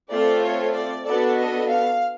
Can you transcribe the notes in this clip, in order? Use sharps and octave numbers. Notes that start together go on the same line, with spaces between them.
A3 C4 F4 A4 D5
C#5
D5
B3 D4 F#4 A4 D5
D#5
F5